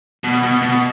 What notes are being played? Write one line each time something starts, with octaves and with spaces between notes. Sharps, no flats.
B2
B2
B2